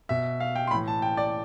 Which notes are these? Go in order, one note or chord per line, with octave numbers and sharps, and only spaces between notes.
B2 E5
F5
G5
C6
A2 E3 B5
A5
G5
D5